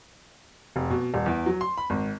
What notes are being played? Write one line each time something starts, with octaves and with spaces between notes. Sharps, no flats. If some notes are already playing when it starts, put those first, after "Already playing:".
F1
B2
D#1
E2
F#3
C6
B5
G#1